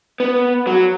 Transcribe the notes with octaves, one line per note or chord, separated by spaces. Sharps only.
B3
F#3